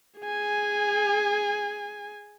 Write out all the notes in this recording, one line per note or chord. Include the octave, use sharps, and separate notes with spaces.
G#4 G#5